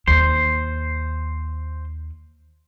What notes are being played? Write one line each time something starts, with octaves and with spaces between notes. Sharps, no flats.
D#2 C5